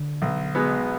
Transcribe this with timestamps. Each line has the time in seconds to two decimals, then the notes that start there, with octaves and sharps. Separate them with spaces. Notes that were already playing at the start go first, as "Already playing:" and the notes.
Already playing: D3
0.22 B1
0.55 B2 G#3 B3